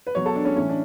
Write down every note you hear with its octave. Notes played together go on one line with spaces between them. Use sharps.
B4
B2 F#3 C#5
A4
D4
C#4
A2 E3 C#4
D4